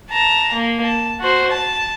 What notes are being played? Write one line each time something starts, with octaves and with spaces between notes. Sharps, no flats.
A5 A#5
A#3
A5
F#4 C5
A5